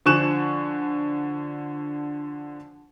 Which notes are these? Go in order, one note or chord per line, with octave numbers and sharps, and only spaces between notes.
D3 F3 G#5 C#6 F#6 E7